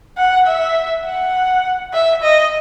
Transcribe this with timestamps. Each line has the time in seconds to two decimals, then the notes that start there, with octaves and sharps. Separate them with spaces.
0.18 F#5
0.47 E5
1.06 F#5
1.93 E5
2.23 D#5